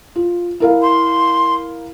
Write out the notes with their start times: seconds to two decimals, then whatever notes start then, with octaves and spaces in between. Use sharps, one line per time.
0.16 F4
0.60 E4 A#4 F5
0.82 C6